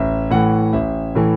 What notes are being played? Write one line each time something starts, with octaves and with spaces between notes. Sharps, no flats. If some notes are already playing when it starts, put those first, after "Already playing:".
Already playing: A1 E5
A2 E3 A3 F#5
A1 E5
A2 E3 A3